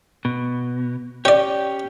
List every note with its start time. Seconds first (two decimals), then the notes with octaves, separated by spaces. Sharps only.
0.25 B2
1.25 C#4 G4 C#5 D5